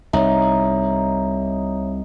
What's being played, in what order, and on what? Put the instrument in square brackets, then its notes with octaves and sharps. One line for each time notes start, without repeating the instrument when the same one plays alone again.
[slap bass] C2 [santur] D#4 [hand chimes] C#5 E5